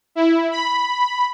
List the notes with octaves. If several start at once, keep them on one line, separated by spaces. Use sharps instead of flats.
E4
B5